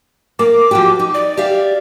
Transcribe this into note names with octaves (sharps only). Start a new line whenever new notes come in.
A#3 D6
F3 F#4 G4
D#4
D5
G4 E5 F5